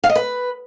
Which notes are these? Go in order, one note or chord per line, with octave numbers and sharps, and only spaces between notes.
F5
D#5
B4